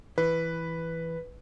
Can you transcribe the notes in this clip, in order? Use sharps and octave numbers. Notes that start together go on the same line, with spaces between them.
E3 B4